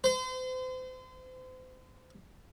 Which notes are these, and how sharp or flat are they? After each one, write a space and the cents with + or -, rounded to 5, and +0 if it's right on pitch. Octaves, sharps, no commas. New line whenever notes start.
C5 -35